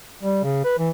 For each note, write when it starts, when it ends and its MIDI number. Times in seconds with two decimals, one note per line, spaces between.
0.23 0.40 55
0.44 0.62 49
0.64 0.76 71
0.79 0.90 52